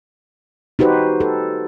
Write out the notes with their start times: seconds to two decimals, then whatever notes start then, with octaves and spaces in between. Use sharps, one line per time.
0.79 D#4 F#4 G4 B4 C5
1.20 A4